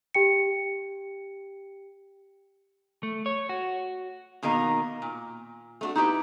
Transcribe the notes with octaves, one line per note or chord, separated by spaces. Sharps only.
G4 G5 C#7
A3
C#5
F#4
B2 D#3 A#3 D#4
A#2
A3 D4 F#4
D#4 E4 G4 B4